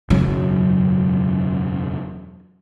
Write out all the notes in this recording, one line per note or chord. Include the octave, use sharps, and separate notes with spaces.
E1 F#2 C#3 F#3